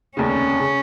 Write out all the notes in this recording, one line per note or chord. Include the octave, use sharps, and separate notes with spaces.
F1 D#2 C#3 C#4
C#3